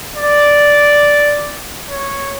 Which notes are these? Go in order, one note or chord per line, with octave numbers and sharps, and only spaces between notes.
D5
C#5